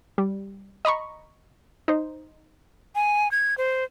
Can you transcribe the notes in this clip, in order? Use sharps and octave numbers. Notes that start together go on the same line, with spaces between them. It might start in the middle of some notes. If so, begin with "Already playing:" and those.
G3
D#5 A#5 B5 C#6
D#4 C5
G#5
G#6
C5